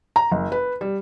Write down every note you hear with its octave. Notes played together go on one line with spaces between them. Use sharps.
A#5
F#1
B4
G3